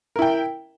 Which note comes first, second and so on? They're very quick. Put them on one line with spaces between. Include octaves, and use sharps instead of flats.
A#4 E4 G5